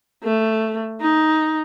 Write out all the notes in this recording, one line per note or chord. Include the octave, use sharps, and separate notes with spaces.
A3
D#4